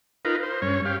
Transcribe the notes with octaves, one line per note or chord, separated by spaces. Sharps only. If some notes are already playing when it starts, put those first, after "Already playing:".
D#4 F4 A#4 B4
C5
G2 C#4 C#5
G4 F5